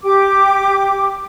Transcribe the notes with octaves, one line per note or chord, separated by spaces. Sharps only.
G4 D6